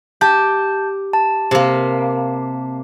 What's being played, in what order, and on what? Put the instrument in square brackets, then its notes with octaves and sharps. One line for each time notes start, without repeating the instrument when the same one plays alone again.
[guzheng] G4 [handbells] A5 G6
[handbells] A5
[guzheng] C3 A#3